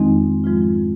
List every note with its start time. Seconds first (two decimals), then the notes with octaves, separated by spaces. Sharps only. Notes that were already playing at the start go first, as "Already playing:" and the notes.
Already playing: F2 D#3 G#3 C4 D#4
0.44 G#2 F3 G#3 F4